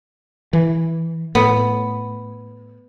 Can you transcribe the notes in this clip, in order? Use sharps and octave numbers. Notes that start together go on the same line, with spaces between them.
E3
A2 B3